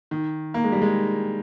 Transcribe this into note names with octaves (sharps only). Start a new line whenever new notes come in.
D#3
A#3
G#3
G3
G#3